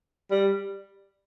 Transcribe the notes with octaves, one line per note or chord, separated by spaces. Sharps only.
G3